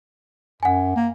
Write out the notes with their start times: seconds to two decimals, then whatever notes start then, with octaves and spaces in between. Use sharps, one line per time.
0.63 F#2 F#5 G#5
0.96 A#3